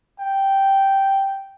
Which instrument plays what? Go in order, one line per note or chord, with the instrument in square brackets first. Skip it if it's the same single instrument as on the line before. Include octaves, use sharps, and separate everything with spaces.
[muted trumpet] G5